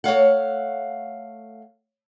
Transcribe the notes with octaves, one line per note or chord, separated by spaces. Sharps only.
A3 C#5 F5 F#5